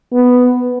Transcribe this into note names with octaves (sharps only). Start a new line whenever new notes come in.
B3